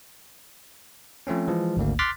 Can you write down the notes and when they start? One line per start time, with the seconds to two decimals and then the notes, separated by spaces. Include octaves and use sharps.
1.27 F3 A3 C4 C#4
1.48 E3 F3 G#3
1.77 G#1 D2 A#3
1.99 C6 D6 F6 F#6 A6 B6